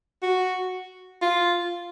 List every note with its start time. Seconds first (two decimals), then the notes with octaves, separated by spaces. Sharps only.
0.23 F#4
1.22 F4